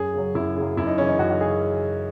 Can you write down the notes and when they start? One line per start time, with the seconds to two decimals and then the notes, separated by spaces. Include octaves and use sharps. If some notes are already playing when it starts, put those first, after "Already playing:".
Already playing: F#2 G#4
0.14 C#3 F#3
0.35 F#2 E4
0.56 C#3 F#3
0.77 F#2 E4
0.87 D#4
0.98 C#3 E3 C#4
1.08 D#4
1.19 F#2 F#4
1.30 F#4
1.41 C#3 G#4